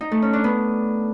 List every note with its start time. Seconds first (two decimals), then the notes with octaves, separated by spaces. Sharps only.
0.01 D#4
0.12 A3
0.22 C#4
0.33 D4
0.44 B3